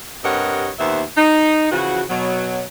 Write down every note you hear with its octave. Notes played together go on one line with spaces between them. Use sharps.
G2 C3 A#4 C#5 D#5 F#5
D#2 A#2 B3 C5 E5
D#4
C#3 E3 F3 F#4
B2 F#3